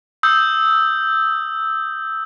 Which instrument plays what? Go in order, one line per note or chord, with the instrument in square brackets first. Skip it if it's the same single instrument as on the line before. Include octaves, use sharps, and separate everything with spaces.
[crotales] D#6 E6 G6